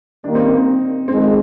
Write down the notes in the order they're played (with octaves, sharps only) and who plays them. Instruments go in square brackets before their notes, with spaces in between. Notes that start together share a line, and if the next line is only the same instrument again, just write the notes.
[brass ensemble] D#3 G3 A#3 [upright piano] D4
[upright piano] C4 D#4
C4
C4
[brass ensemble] F2 D#3 G#3 D#4 [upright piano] C4